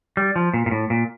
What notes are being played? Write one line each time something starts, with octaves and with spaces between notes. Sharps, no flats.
G3
F3
A#2
A#2
A2
A#2